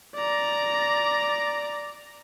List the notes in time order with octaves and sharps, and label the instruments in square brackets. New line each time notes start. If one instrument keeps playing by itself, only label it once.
[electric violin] D5 A#5